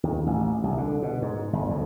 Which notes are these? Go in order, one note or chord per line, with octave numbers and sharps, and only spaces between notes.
D#2
A1
C2
D3
B2
G#2
G1
D2